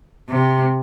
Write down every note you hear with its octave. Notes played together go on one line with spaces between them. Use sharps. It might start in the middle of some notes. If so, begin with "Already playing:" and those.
C3